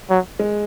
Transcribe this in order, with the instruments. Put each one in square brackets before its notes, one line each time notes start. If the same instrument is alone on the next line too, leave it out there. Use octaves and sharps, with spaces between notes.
[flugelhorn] F#3
[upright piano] G#3